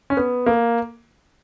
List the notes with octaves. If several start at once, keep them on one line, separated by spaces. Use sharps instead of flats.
C#4
B3
A#3